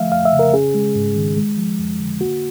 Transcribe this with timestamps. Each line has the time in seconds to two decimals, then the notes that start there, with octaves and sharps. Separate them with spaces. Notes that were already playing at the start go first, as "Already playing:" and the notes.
Already playing: D3 F3 A3 E5 F5
0.12 F2 F5
0.25 E5
0.33 C#3
0.39 A#4
0.54 C#4 G#4
0.74 G#3
0.96 G#2
1.16 D#3
1.37 G#3
1.58 F3
1.79 F2
2.00 D3
2.21 A#3 F#4